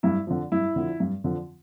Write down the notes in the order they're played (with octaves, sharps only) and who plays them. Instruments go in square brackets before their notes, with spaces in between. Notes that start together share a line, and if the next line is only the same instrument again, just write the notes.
[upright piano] G2 E4
D3 F3
G2 E4
D3 F3
G2
D3 F3